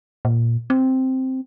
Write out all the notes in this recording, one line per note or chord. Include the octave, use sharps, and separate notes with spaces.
A#2
C4